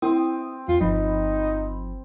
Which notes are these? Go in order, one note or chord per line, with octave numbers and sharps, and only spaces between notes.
C4 E4 D#6
E2 F4
G1 F3 D#4 B5